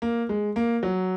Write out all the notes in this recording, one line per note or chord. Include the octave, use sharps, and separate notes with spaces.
A#3
G#3
A#3
F#3